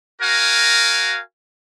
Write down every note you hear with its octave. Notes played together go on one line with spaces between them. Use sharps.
F#4 A#4 F5 G#5